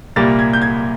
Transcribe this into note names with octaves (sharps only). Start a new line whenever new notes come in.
C2 A#2 G3 A#3 A6
G#6
G6
G#6